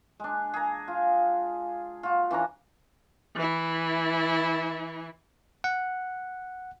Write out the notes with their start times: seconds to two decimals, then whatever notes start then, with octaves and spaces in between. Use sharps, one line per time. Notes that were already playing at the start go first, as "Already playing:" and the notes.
0.20 G#3 D4
0.54 G#4 A#5
0.88 F4
2.03 F4 F#4
2.31 E3 C#4 D4 A#5
3.35 E3 E4
5.64 F#5